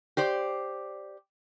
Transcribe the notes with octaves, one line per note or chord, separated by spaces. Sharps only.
G4 C5 D5